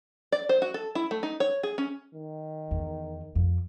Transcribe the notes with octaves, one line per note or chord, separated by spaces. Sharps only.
D5
C5
F#4
A4
E4
A3
D#4
C#5
G#4
C#4
D#3
E2
F2